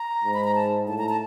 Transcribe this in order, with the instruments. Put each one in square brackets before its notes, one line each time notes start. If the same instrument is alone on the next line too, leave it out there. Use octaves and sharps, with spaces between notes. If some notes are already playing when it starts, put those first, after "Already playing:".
Already playing: [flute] A#5
[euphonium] G#2
[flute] B5
A#5
A5
[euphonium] A2 [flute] A5
[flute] A#5
A5